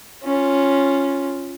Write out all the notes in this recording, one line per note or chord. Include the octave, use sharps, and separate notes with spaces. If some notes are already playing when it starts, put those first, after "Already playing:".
C#4 F4